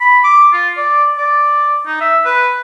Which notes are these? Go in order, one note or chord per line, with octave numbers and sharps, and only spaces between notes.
B5
D6
F4
D5
D5
D#4
E5
B4